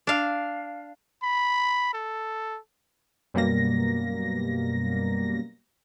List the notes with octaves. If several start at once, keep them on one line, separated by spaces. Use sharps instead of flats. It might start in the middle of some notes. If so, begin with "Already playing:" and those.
D4 F5
B5
A4
F#2 B2 G3 A#3 A#6